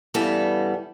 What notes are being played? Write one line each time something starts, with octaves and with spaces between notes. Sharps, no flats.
G2 C#3 E3 G3 B3 A4